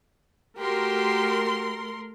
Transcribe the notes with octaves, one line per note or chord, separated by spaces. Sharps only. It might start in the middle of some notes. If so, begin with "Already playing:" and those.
A3 F#4 G4 A#4 C6